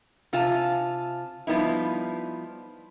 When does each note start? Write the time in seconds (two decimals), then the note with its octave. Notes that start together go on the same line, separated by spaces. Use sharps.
0.33 C3 F4 G#5 A5
1.47 F3 G3 B3 D#4 E4